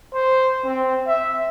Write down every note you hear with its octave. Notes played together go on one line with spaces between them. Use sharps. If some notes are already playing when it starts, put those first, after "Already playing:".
C5
C4
E5